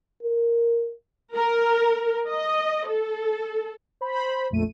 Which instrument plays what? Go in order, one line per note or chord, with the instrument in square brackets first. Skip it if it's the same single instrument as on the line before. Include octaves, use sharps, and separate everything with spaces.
[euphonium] A#4
[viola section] A#4
D#5
A4
[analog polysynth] C5 B5
A#1 F2 A3 D#7